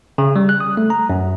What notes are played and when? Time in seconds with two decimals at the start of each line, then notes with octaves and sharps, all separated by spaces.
0.18 C#3
0.36 G3
0.49 F#6
0.60 D#6
0.77 A3
0.90 A#5
1.10 F#2